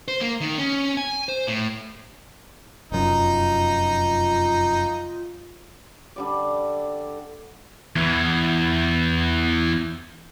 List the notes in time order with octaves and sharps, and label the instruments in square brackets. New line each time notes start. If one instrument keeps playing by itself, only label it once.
[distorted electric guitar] C5
A#3
D#3
C#4
G#5
C5
A2
[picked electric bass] F1 F#2 [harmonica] D#4 [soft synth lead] F4
[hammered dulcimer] D3 G3 D5
[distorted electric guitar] E2 E3